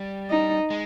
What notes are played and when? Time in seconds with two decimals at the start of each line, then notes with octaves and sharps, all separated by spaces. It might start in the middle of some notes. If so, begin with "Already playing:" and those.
Already playing: G3
0.30 D#4
0.70 G#3